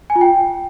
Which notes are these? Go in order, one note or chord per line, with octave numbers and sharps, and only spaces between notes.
G#5
F4
G5